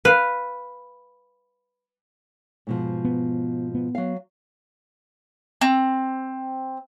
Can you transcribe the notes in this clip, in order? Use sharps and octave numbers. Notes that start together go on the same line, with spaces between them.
B4 F5
G#2 B2 F3
B3
B3
F#3 F5
C4